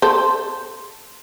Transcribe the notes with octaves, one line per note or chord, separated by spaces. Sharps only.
A4 C5